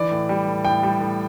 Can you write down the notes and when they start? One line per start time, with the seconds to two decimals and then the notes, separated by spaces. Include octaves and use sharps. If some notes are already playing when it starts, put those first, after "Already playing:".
Already playing: E3 D5
0.11 A2
0.29 G3
0.47 A2
0.65 A2 G5
0.83 G3
1.01 A2